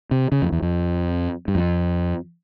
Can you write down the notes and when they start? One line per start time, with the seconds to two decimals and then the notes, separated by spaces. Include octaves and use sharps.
0.11 C3
0.32 C#3
0.42 F2
0.52 E2
0.62 F2
1.48 G2
1.55 F2